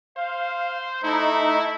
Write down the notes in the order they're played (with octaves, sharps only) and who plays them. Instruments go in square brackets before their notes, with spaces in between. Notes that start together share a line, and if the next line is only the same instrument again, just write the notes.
[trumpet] C5 [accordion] F5
[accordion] A3 D#4 [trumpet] E4